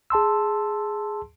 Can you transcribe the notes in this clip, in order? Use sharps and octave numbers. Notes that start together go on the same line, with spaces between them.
G#4 A5 C6 E6